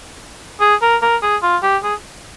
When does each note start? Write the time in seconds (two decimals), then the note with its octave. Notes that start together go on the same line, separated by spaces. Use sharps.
0.61 G#4
0.82 A#4
1.02 A#4
1.22 G#4
1.43 F4
1.63 G4
1.83 G#4